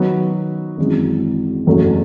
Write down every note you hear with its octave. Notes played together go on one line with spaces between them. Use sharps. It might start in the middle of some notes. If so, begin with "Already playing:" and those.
Already playing: D#3 F#3 B3 F#4
G#1 F#2 E3 G#3
F#1 E2 B2 F#3 A3